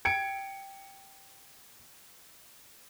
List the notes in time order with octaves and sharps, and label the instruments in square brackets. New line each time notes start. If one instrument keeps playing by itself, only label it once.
[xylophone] G5 [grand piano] G#6 C#7 D7